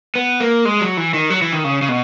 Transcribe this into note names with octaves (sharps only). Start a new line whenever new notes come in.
B3
A#3
G#3
F#3
E3
D#3
F#3
E3
D#3
C#3
C#3
B2